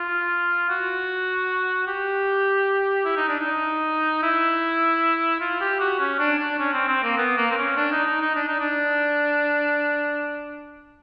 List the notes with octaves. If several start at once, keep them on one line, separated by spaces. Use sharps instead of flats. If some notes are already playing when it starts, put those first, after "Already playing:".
Already playing: F4
F#4
G4
E4
D#4
D4
D#4
E4
F4
G4
F#4
C#4
D4
D4
C#4
C4
C4
A#3
B3
A#3
C4
C#4
D4
D#4
D#4
D#4
D4
D#4
D4